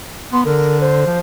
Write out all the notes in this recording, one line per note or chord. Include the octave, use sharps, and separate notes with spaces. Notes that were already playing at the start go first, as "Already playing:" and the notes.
B3 C6
D3 A#4
C5
F3